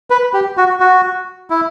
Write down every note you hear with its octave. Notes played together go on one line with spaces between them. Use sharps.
B4
G4
F#4
F#4
E4